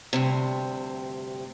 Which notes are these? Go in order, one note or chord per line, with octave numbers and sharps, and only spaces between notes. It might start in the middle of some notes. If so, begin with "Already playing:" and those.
D2 G2 C3